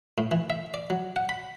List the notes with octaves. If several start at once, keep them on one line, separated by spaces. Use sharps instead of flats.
A2
E3
E5
D5
F#3
F#5
B5